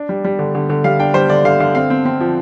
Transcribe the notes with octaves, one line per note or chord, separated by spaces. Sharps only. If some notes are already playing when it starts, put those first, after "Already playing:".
Already playing: D4
G3
G3
D3
D3
D3
G3 F5
D4 G5
G3 C5
D3 D5
D3 F5
D3 F5
C4 F5
C4
C4
F3